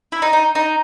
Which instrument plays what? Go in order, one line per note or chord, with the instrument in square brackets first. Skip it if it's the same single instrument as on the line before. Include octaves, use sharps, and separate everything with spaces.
[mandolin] E4
D#4
D#4
D#4